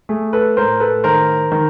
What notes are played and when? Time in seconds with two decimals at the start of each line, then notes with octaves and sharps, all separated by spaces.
0.09 A3 G#4
0.33 A4 B4
0.57 A2 A#4 C5
0.80 A4 B4
1.04 D#3 A#4 C5
1.52 D#3